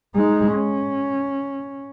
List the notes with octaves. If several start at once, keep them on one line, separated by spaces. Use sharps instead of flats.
G#3 D#4
C#4